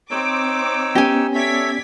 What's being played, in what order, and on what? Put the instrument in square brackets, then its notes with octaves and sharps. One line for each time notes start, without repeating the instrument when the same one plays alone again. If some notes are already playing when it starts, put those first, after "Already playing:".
[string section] C4 D6 [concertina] D#4 C#5 E6
[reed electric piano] B3 C#4 [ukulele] G4 G#5
[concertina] A4 C#5 E5 [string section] D5 G#6 B6